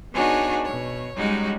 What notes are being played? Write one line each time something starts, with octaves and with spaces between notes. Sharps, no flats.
B3 D4 D#4 F#4 G#4 C#5
B2 C#5
G3 G#3 C#4 D#4 F#4